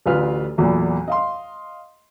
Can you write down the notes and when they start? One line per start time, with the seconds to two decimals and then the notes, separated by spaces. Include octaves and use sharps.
0.06 A1 D2 F4 B4 F6
0.58 B1 E2 A#2
1.08 D#5 F5 C6